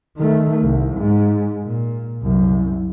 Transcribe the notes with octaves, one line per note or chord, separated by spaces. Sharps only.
D#3 A3
C2
G#2
A#2
C2 F#2